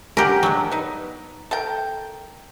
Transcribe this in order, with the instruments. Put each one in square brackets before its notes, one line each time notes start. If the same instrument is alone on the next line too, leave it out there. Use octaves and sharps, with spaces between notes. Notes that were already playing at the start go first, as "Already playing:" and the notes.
[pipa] C#4 D4 F#5 [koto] G4 A#4
[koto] F#3 [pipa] G#3 D4
[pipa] B3 D#4
A4 A#4 G5